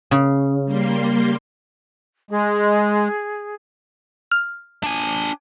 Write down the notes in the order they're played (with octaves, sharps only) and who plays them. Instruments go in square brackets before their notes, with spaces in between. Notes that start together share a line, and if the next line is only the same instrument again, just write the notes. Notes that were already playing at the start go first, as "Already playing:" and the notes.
[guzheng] C#3
[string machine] G3 A#3 C6
[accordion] G#3 [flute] G#4
[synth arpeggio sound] F6
[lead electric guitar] D4 G#5